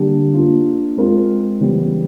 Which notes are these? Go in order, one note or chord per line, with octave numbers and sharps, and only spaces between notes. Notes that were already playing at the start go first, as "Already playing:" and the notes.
Already playing: D3 G3 A#3 D4 G4
A#3 D4 F4
G#3 C4 F4 A#4
C#3 E3 G3 B3